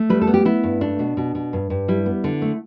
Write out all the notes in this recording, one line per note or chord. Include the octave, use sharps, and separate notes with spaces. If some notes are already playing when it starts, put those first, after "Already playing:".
Already playing: A3
G3 B4
A4
B3
G4
B3 E4
G2
A3 D4
B2
B2
B2
G2
G2
G3 E4
B3
D3
A3